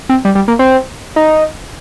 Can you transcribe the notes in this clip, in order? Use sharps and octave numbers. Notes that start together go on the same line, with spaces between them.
C4
G3
G3
A#3
C4
D#4